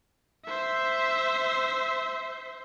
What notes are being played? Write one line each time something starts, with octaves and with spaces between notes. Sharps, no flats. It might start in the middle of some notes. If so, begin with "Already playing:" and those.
C5 E5